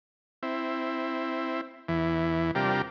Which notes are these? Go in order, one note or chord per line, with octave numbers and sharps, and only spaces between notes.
C4 E4
E2 E3
C3 G3 D4 F4 G4 A#4